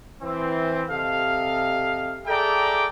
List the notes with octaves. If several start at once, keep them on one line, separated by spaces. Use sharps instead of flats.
E3 C4
C3 A4 D#5 F5
G#4 A4 D5 E5 G5 A#5